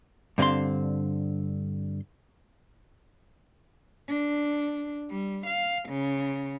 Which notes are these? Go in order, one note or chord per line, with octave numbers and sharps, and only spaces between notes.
G2 D3 C4 F5 C6
D4
G3
F5
C#3